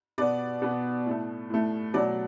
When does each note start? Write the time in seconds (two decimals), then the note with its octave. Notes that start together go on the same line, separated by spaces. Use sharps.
0.18 B2 B3 D5
0.62 B2 B3
1.06 A2 A3
1.50 A2 A3
1.94 B2 F#3 A3 D5